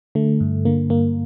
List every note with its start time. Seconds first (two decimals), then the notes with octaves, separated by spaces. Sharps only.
0.15 D3 A3
0.41 G2
0.65 D3 A#3
0.90 G2 A#3